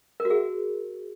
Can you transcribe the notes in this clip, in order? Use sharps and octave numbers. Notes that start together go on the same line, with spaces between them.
A#4
F#4
G#4